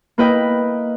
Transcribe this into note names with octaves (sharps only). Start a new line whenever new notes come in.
A#3 E4 B4 D#5 G5